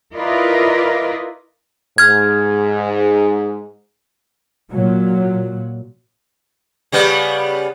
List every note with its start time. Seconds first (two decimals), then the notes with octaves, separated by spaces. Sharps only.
0.14 E4 F4 A#4 B4 D5 D#5
1.98 G#2 F6 G#6
4.72 A#2 F#3
6.92 C#3 G3 B3